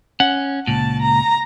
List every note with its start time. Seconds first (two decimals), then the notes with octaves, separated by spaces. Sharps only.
0.20 C#4 F#5
0.67 C#2 A#2 A5
1.02 A#5